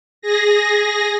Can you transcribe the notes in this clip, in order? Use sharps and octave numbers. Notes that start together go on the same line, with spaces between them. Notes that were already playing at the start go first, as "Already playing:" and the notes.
G#4 A#6